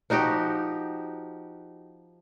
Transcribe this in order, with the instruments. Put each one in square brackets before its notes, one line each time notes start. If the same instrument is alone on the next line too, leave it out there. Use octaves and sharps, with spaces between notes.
[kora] F3 D#4 F#4 G4